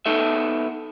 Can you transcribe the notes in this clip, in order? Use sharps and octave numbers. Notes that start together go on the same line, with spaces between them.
B3 D#4 A4 E5